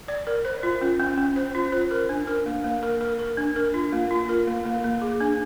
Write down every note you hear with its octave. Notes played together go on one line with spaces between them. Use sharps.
D5
A#4
C5
F4
C#4
C#4
C#4
C5
F4
C5
A#4
D4
A#4
A#3
A#3
A#4
A#4
A#4
D4
A#4
F4
A#3
F4
A#4
A#3
A#3
A#3
G#4
D4